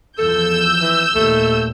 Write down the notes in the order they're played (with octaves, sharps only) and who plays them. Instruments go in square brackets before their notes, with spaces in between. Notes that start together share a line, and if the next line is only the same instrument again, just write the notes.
[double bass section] E2 F3 [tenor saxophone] A4 [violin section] E6 G6
[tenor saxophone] E3
[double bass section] D#2 A#2 [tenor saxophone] A3